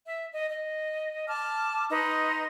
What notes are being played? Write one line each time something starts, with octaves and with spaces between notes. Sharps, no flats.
E5
D#5
D#5
A5 D6 F6
D#4 B4 A#5 C6